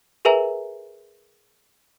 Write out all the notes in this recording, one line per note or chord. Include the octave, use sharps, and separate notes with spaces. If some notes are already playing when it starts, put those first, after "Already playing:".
G#4 A#4 B4 E5 G#5 A#5